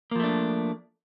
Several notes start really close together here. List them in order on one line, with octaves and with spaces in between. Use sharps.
A#3 F3 A3 D4